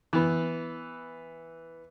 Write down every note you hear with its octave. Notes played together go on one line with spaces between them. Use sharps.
E3 B3